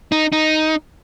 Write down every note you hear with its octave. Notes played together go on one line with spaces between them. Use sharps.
D#4
D#4